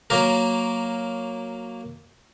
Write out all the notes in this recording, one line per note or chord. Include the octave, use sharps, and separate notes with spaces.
F#3 A#3 A#4